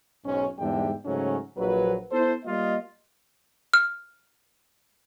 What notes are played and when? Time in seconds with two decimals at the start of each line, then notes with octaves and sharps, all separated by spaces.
0.25 B1 G#2 C#4
0.59 E2 G#2 D3 G3 E5 G5
1.05 G#2 C#3 F#3 A3 C#4
1.57 A#1 F#3 B4
2.12 B3 E4 A4 C5
2.45 G3 A#3 F4 D#5
3.74 F6